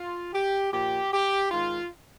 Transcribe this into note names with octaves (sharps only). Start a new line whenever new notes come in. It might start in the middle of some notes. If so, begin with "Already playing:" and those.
Already playing: F4
G4
A#2 F3 G4
G4
G#2 D#3 F4